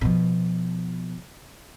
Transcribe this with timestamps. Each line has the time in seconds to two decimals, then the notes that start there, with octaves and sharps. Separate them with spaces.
0.01 B2 F3